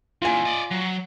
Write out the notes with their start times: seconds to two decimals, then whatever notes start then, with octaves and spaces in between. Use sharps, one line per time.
0.22 A#2 E3 F4 G#5
0.45 D5 D#5
0.71 F#3